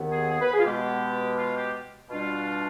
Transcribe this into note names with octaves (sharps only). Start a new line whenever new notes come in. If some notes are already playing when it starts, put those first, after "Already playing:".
Already playing: D#2 D#3 B3
G#4
G#4
B4
G#4
F4
B2 G#3 B3 G4
F4
G4
B2 G3 D4 F4